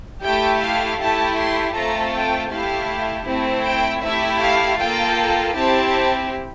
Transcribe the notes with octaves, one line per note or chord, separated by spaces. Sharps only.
A3 E4 G4 G5
F5
A3 E4 G4 A5
C6
A3 C4 F4 A4 A#5
G5
A3 E4 G4 F5
A3 C4 E4
G5
A3 E4 G4 E5
F5
A#3 F4 A4 G5
C4 E4 G4 A5